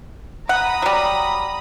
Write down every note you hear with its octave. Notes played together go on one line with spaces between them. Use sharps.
F#5 A#5 B5 D#6
F#3 G3